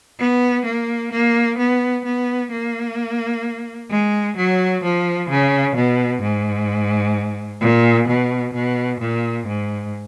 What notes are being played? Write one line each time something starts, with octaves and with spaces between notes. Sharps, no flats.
B3
A#3
A#3
B3
B3
A#3
G#3
F#3
F3
C#3
B2
G#2
A#2
B2
B2
A#2
G#2